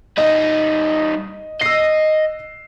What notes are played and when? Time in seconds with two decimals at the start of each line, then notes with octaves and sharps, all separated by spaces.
0.18 G3 D#4 D#5
1.61 D#5 E6 C7